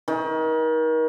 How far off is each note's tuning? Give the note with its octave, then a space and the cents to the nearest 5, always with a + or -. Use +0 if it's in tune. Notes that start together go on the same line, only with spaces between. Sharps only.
D#3 +35